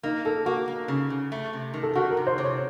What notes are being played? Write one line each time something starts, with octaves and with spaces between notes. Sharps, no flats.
A#3 D#4
A#3 A4
A#3 F#4
A#3
C#3
C#3
A3
C3
D#3
A4
D#3 F#4
A#4
C3
C5
C3
C#5